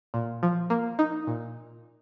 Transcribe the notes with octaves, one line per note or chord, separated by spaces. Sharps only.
A#2
F3
A#3
D#4
A#2